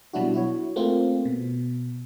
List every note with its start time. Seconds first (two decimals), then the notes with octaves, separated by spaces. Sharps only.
0.13 B2 F#3 G3 D4 E4 F#4
0.34 E4 F#4 C#5
0.76 A3 A#3 C4 F4
1.25 B2